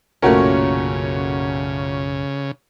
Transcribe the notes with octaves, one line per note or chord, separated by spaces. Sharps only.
B1 F#2 A#2 C#3 A3 C#4 F#4 A#4